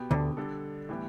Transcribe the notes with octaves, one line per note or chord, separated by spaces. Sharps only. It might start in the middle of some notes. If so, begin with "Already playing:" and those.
Already playing: B2 B3 G4
D2 D3
D3 G3 D4 A4
A2 E3 G3 B3 G4